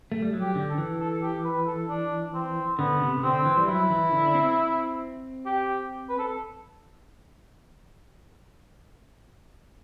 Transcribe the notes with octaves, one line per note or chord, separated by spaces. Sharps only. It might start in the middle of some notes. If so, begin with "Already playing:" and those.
A3
G3
F#3
G4
D3
A4
E3
A4
G4
B4
A4
D4
C4
D3 B3
C3
C3
D3 C4
E3
G3
F#3 E4
E3
D3
D4
C4
G4
B4
A4